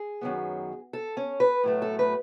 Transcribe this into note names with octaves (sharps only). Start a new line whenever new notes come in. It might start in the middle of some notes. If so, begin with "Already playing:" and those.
Already playing: G#4
F#2 D#3 F#3 B3
A4
C#4
B4
A2 F#3 A3
A4
B4